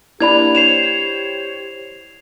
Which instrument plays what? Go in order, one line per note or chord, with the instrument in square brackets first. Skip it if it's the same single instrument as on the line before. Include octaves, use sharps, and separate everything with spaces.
[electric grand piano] A#3 D4 [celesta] E4 D5 B5 [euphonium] G4 [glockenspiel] G#6 F7
[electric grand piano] C5 C#5 [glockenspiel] C7 E7 F7